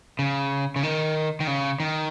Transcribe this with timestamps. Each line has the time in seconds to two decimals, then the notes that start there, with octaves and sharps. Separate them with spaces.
0.19 C#3
0.76 C#3
0.83 D#3
1.40 D#3
1.47 C#3
1.80 D#3